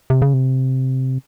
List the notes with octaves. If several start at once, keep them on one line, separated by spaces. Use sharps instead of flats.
C3
C#3
C3